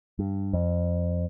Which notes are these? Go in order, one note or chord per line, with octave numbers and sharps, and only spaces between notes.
G2
F2